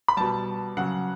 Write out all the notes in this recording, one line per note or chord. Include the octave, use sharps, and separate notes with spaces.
B5
B2 G3 A5
C#3 F#3 F#5